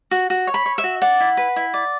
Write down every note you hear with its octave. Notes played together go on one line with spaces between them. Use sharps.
F#4
F#4
C#5
B5
C#5
E5
F#4
D5 F#5
E4
B4
E4
D5